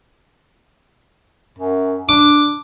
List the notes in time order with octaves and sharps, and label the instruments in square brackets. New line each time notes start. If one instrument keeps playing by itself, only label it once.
[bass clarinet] F#2
[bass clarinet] D4 [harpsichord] D6